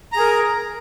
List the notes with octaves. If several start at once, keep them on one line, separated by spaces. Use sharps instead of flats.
G#4 A#4 A#5